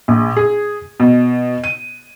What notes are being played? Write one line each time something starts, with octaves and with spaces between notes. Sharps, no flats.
A#1
G#4
B2
D#7